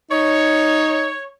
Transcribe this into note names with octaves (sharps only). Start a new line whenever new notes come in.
D#4 C#5